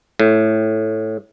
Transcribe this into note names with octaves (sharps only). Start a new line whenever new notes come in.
A2